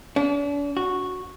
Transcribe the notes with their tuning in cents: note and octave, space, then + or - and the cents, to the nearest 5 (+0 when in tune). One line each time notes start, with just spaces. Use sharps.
D4 -45
F#4 -10